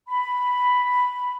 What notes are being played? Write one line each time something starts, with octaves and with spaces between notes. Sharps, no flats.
B5